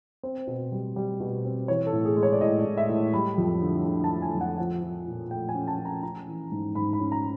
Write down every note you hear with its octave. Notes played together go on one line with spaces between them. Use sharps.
C4 C5
B2
G3
G3
B2
C4
E3 C#5
A4
A2
G#4
G#3
C#5
D5
A2 D#5
D5
A2
E5
A2
G3 B5
F2
D3
D3
A5
D3
G#5
F2
F#5
F3 F#5
F3
A#2
A3 G5
G#5
C#4
A5
C#4
A#5
C#4 A#5
E3
G#2
G#2 B5
B5
C#4
A#5